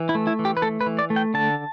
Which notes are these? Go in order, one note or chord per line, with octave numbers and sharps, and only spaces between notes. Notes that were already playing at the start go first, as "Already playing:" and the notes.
Already playing: E3
E4
A3
E4
E3
G4
B4
A3 A4
B4
E3
D5
A3
G5
D3 A5